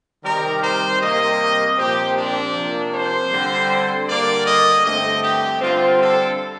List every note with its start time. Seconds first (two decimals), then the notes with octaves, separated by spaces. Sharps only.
0.23 C3 D#3 G3 A#4
0.62 C5
1.00 C3 G3 A#3 D#5
1.77 A#2 F3 C4 G4
2.15 D4
2.54 C3 F3 A#3
2.92 C5
3.31 D3 G3 C4
4.07 D3 G3 A#3 D5
4.46 D#5
4.84 G2 D3 A3 C4 D#5
5.23 G4
5.61 D3 G3 C4 F4
5.99 A4